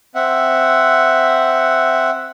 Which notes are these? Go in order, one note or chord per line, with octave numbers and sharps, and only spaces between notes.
C4 E5 F#5